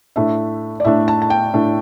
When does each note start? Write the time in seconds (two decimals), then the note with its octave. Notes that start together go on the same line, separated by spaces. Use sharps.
0.16 A2 A3 D4 E5
0.80 D5
0.85 A2 A3 D4 E5
1.08 A5
1.22 A5
1.30 G5
1.53 A2 A3 D4